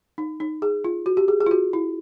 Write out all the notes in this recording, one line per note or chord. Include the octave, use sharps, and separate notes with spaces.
D#4
D#4
G#4
F4
F#4
G4
G#4
G#4
F4
F#4
E4